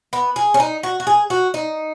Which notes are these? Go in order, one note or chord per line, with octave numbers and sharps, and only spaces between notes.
B3
G#4
C#4
D#4
F#4
F#4
G#4
F#4
D#4